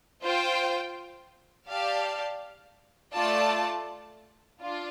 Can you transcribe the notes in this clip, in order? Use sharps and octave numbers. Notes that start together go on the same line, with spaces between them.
F4 C5 G5
G4 D5 F5 A5
A3 F4 D5 A5
D4 F4